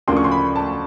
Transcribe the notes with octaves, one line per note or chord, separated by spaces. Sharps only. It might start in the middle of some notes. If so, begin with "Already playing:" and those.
D2 C#3 F3 A#3 C6
C#6
C6
B5
A5